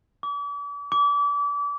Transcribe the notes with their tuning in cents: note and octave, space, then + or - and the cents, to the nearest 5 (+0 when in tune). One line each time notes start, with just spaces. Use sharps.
D6 -40
D6 -30